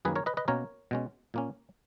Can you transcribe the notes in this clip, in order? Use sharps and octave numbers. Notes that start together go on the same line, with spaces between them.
F#2 D#3 A#3 C#4 G#4 B4
A#4 C#5
B4 D#5
B4 D#5
B2 A#3 C#4 A#4 C#5
B2 G#3 C#4
A#2 A#3 C#4